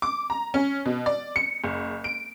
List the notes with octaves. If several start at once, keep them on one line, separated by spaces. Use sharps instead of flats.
D6
A#5
C#4
B2
D5
C#7
F#1
D7